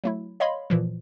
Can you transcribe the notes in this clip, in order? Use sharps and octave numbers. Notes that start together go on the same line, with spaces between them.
F#3 A3 E4
C#5 D#5 F5 B5 C6
A#2 E3 F3